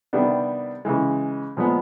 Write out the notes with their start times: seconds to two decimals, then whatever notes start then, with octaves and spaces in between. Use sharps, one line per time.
0.13 C3 D#3 G3 B3 D4
0.85 C#3 E3 G#3
1.57 A#2 F3 G#3 B3